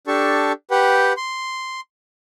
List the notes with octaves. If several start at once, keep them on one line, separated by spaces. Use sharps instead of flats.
D4 G4 A4 A5 C#6
G4 B4 F#5 G5
C6